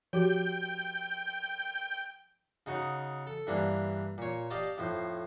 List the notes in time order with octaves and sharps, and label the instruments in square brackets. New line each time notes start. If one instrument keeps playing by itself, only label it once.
[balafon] F3 F#4 G4 [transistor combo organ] G5
[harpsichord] C#3 D#4 F#4
A4
G2 E3 A#3 D4
A#2 C#5
G4 D5 D#5 F5 A5 D6
F2 A2 C5